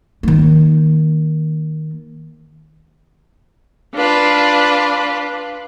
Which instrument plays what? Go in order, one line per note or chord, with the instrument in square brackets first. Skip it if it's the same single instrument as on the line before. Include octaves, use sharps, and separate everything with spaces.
[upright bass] D#3 A#3
[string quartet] D4 F4 B4